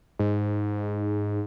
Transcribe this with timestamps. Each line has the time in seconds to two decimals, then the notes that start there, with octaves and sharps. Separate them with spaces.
0.19 G#2